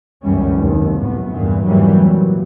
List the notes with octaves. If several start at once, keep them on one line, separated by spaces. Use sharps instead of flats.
G1 C#2 F#2 E3 G3 C#4
F1 D#2
B1 A2 B3
E2 G2 A#2 E3
F1 G#2 E3 F#3 G3 A#3
A#2 F#3